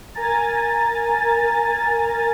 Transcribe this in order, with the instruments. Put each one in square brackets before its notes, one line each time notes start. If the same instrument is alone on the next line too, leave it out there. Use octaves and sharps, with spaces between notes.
[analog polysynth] A#4 G#5 A#5 A6